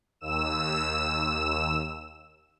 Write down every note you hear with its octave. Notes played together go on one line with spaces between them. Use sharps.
D#2 E6 E7